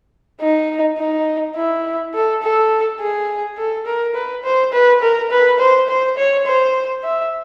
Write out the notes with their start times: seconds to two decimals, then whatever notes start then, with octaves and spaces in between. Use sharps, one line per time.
0.40 D#4
0.98 D#4
1.56 E4
2.14 A4
2.42 A4
3.00 G#4
3.58 A4
3.86 A#4
4.15 B4
4.44 C5
4.73 B4
5.02 A#4
5.31 B4
5.59 C5
5.89 C5
6.17 C#5
6.46 C5
7.04 E5